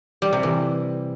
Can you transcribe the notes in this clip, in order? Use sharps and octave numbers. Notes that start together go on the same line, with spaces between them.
G3
C3
E3